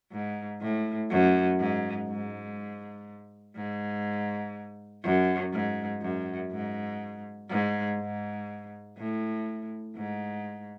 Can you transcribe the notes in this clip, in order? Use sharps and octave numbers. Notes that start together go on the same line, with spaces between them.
G#2
A2
F#2
G#2
G#2
G#2
F#2
G#2
F#2
G#2
G#2
G#2
A2
G#2